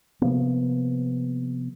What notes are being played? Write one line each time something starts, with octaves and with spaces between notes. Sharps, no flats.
C3 F3 A#3 B3